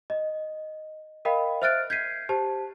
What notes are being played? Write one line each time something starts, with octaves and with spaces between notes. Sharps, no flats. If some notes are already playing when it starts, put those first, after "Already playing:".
D#5
A#4 D#5 F5 G5 B5
C5 E5 F6 F#6 A6 D7
G6 G#6 B6 C7 D#7
G4 C5 A5